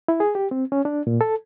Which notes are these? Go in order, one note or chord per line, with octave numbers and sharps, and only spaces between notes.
E4
G#4
G4
C4
C#4
D4
A#2
A4